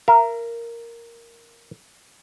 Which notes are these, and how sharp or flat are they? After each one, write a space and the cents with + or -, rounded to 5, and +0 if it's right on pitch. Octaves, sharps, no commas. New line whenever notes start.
A#4 +0 E5 +45